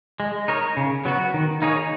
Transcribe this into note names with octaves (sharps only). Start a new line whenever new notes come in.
G#3
D#4 A#4 C#5
C#3
F#3 B3 F#4
D#3
A#3 D#4 G#4 C#5